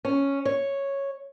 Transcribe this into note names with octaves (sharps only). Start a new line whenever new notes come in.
C#4
C#5